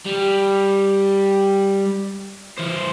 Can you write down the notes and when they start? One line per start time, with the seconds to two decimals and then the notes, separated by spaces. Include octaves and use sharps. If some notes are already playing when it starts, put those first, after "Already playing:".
0.05 G3
2.58 E3 C5